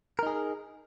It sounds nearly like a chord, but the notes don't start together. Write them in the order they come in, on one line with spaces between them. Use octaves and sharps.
A#4 D#4 G#4